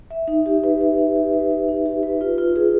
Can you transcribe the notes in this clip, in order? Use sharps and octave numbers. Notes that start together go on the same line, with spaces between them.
E5
D#4
G4
B4
E5
D#4
G4
B4
E5
D#4
G4
B4
F4
F4
G#4